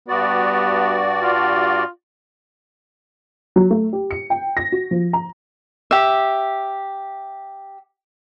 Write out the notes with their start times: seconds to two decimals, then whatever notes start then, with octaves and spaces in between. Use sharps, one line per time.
0.09 G2 B3 F#4 D5
1.23 F4
3.56 F#3
3.70 A3
3.93 G4
4.11 C#7
4.30 G5
4.57 A#6
4.72 F#4
4.91 F3
5.13 A#5
5.91 G4 E5